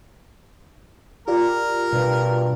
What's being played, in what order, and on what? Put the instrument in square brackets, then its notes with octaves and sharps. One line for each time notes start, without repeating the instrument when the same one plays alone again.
[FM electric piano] F4 G4 D5 [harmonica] A#4
[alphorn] G2 [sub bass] B2